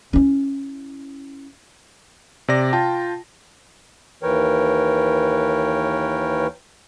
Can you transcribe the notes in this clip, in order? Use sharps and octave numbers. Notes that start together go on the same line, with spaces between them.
C#4 E4
C3 D5 A#6
F4 G5 A5
D#2 E3 A#4 B4 C#5 G5